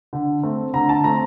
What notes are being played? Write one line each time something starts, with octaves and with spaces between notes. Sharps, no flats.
D3
A3 C4
D3 A#5
A5
A3 C4 A#5